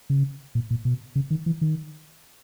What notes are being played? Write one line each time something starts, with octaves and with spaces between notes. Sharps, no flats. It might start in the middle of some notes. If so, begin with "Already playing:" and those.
C#3
A#2
A#2
B2
C#3
D#3
E3
D#3